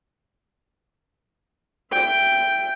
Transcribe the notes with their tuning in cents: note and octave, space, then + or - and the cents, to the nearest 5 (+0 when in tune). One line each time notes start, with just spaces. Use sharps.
E5 +25 G5 +0